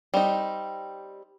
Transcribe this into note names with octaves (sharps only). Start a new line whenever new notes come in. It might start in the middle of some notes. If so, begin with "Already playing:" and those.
G3 C4 D#4